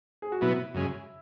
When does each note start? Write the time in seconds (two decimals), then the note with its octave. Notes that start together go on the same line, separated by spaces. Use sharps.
0.22 G#4
0.32 F#4
0.41 B2 F#3 B3 E4
0.74 F#2 C#3 G#3